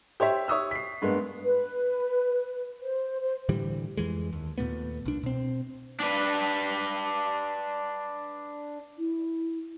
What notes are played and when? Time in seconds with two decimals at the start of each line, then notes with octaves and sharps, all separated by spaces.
0.20 G4 C5 C#5 E5
0.48 C#5 C#6 D#6 E6
0.71 B6 C7
1.02 G2 G#3 A#3 B3
1.43 B4
2.81 C5
3.21 C5
3.49 A2 D3 E3 G3
3.97 F2 E3 G#3
4.33 D#2
4.58 D#2 A#2 A3 B3
5.06 C2 D4
5.23 B2 C4
6.00 D4 B4
8.99 E4